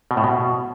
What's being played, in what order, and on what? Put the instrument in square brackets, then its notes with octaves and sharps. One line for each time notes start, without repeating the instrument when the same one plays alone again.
[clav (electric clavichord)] B2
A2
B2